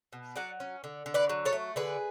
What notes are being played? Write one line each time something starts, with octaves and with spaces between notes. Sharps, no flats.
B2
F#3 D5 F#5
C#4
D3
D3
B4 D5
F#3
A4 C#5
A3
D3 G#4 B4